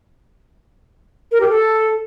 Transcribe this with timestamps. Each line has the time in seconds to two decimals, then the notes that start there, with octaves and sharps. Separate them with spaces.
1.32 A#4
1.40 G4
1.49 A4